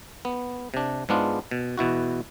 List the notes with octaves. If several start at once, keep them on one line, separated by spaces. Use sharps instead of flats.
B3
C3 D4
G#2 G#3 B3 D4 F4
B2
E2 B2 E4 F#4